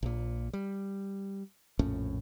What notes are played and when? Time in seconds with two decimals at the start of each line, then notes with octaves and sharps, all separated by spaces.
0.03 A#1 A#2
0.53 G3
1.79 A#1 F2 A2 C#4